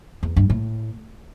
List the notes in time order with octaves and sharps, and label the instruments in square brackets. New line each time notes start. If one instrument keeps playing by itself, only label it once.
[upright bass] E2
G2
A2